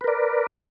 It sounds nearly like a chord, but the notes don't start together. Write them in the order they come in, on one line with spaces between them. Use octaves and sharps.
B4 A#4 D5